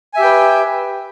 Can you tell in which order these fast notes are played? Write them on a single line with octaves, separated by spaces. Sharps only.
G#5 E5 G4 G5 B4